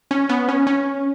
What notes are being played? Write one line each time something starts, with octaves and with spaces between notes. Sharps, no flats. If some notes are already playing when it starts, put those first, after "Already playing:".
C#4
B3
C#4
C#4